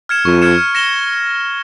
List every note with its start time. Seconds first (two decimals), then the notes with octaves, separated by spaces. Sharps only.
0.09 F6 G#6 C#7 E7
0.25 F2 C#6
0.42 F6 G#6 C#7 E7
0.58 F6
0.75 A#6 C#7 E7 G7